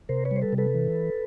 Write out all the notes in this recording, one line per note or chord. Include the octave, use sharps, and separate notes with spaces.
C3 A#4 C5
B4 C#5
G3 C5
A4 B4
C3
A4 B4
E3